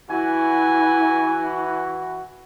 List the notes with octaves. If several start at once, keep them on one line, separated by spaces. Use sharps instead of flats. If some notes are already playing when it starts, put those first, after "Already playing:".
E3 E4 F#4 G#5